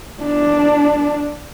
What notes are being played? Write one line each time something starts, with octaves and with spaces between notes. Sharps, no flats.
D4